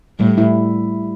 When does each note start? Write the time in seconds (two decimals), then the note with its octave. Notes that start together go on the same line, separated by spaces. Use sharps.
0.20 A2 G3
0.38 E4